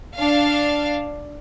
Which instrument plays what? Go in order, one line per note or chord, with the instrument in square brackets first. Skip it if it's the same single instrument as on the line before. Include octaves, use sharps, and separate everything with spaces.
[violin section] D4 F5